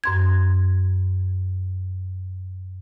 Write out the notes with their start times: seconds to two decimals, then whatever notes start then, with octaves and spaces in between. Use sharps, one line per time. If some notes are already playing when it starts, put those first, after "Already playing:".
0.04 F#2 C6 G#6